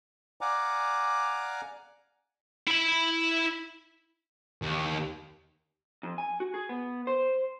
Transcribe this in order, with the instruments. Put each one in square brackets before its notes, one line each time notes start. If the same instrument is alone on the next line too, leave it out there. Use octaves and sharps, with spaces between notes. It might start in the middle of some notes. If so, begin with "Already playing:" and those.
[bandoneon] D5 F5 F#5 G#5 A#5 D6
[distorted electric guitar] E4 B5
D#2
[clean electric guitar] F2
G#5
F#4
G#4
B3
C5